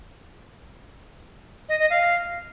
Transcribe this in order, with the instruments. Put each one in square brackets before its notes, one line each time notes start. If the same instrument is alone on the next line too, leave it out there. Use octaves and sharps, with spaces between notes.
[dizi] D#5
D#5
F5